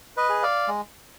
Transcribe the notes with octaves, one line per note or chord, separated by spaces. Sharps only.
B4 D#5
G#4
D5 F5
G#3